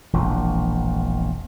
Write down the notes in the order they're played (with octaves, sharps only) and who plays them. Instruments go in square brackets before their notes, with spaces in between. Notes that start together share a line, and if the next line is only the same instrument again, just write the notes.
[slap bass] E1 A#1 E2